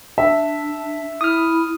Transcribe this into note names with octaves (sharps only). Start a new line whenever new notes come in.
D4 E5
E4 D#6 F6